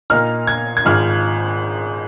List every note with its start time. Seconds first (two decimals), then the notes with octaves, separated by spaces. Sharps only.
0.10 A#2 A#3 D#4 F6
0.47 G#6
0.77 G#6
0.85 G#1 G#2 F3 F6